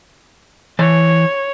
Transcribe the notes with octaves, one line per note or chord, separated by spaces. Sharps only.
E3 C#5 A5